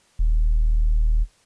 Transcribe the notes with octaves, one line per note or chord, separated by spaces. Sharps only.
D#1